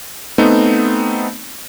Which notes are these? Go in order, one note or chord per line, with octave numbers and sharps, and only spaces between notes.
A3 B3 C4 D#4